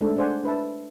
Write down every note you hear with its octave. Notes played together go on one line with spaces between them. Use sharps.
G#3 A3 C4 D4 D#4 A4
D4 G#4 C5 D5 F#5 G#5
D4 B4 E5 A5